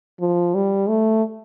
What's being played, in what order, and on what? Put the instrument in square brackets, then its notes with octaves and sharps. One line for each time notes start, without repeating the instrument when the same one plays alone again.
[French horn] F3
G3
A3